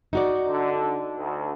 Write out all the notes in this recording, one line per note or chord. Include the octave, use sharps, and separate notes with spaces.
D#4 F#4 D5
D3
D2